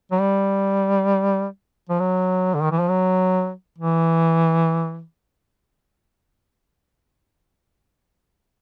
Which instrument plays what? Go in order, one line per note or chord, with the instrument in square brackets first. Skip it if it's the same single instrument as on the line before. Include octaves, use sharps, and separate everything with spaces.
[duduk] F#3
G3
F3
F#3
D3
D#3
E3
F3
F#3
E3